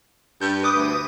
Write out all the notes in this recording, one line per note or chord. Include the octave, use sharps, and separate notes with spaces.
G2 G6
B4 D6 D#6
D2